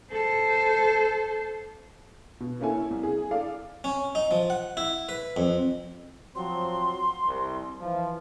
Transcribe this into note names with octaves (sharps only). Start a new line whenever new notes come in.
A4 C5
B2
A#3 C#4 E4 A4 G#5
C2
G#4
A4 D5 F5
C#4
D#4
F3
F#5
E4
B4
F2
F3 F#3 C4 C6
C2
E3 F3